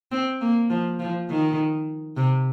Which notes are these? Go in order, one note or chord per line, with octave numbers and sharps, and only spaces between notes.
C4
A#3
F3
F3
D#3
C3